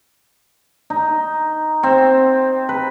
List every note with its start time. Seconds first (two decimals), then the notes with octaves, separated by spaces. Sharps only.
0.90 D#4
1.83 C4
2.69 B4